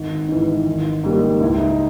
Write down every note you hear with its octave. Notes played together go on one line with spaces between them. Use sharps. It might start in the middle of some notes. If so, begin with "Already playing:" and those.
Already playing: G#1
G#2 E3
G#1
G#2 G3 A#3
C#2 E4
D#4